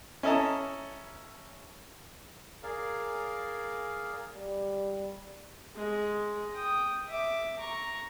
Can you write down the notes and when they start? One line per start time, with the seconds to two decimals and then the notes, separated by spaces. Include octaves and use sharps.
0.23 C#4 E4 A4 D#5 A5 A#5
2.63 G#4 A#4 D5 F5
4.36 G3
5.76 G#3
6.55 G5 D#6
7.08 E5 D6
7.59 A#5 C#6